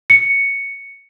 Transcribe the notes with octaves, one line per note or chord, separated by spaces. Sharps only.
C#7